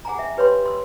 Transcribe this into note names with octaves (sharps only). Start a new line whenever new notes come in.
G#4 F#5 G#5 A#5
E5 G5
G4 B4 C#5 G5 C6
C6 E6